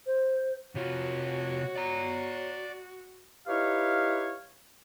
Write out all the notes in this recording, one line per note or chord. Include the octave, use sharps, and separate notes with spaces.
C5
C3 F4 F#4 C#5
D5 A#5
D#4 E4 G4 B4 C#5 F5